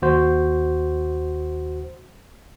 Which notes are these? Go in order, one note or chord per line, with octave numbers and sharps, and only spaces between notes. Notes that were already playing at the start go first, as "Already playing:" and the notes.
D#2 F#4 C5